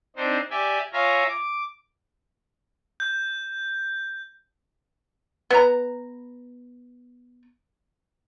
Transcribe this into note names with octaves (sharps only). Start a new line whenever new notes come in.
C4 D4 D#4 C5
G4 D5 E5 G5 G#5
F4 C#5 E5 F5 G#5 A#5
D6
G6
B3 A#5